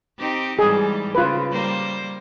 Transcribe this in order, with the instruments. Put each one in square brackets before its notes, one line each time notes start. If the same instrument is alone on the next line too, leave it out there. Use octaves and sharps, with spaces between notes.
[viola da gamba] C4 D#4 G4
[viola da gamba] G#2 E3 G3 [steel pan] G#4
[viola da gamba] C#3 [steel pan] F4 B4
[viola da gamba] G3 A#3 C5